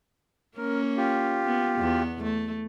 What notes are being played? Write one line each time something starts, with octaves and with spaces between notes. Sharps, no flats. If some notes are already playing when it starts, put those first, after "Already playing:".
A#3 C#4 A#4
F4 G4
B3
E2 B3
A3